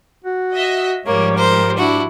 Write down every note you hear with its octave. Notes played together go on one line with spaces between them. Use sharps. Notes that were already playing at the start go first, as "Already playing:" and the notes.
F#4
D#5 E5
G#2 F3 G3 A#3 C#5
A#4 C5
D4 E4 F#4